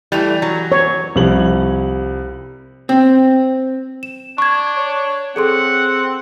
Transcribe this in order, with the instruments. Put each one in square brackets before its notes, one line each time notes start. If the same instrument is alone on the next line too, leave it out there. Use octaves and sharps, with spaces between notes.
[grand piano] E3 F7 [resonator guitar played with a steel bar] G3 A3
[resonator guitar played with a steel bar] F#3
[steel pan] C#5
[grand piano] C2 F3 G3 F#7
[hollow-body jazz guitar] C4
[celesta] E7
[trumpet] D4 [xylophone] C#6 G#6
[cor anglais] C#5
[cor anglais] C4 [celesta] G#4 A4 C6 [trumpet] F#5